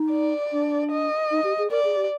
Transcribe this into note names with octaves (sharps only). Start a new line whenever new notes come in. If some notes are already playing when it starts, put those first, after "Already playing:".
Already playing: D#4
D5
D4
D#5
D#4
G4
G#4
A#4 D5
G#4
G4